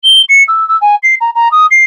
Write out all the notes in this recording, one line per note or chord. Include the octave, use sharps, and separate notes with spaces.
G7
C#7
E6
E6
G#5
C7
A#5
A#5
D#6
C7